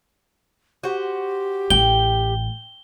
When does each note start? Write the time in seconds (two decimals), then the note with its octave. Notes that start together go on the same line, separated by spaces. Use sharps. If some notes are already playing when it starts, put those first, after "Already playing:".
0.84 F#4 G4 C5
1.70 A1 G5 G7